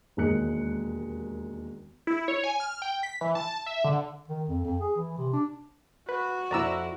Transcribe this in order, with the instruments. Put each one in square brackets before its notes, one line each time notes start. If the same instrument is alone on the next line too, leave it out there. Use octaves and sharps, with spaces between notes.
[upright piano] E1 D#2 G#3 A#3 F#6 C#7
[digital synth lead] E4
C#5
G#5
F6
G5
B6
E3
A5
E5
D3
[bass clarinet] D#3
F2
F2
G#4
E3
C3
D4
[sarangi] F#4 [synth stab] B4
[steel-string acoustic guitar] F2 E4 [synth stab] D5 A#5 E6